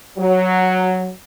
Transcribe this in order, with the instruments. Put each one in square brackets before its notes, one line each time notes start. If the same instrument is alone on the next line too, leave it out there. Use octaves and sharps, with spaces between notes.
[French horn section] F#3